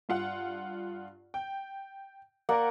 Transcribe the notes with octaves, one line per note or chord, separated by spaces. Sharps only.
G2 F4 F#5
G5
A#3 A#4 D5 F#5